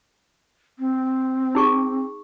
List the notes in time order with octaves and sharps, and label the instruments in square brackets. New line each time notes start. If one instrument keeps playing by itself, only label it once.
[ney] C4
[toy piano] D#4 G#4 C#6